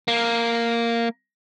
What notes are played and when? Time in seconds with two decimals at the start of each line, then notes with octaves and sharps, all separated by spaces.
0.08 A#3